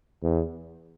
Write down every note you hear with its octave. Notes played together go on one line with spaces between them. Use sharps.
E2